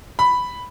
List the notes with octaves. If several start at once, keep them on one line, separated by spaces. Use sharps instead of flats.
B5